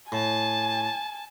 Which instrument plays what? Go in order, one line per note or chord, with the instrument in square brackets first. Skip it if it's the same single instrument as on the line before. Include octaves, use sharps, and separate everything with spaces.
[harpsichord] A2 [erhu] G#5 [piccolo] A5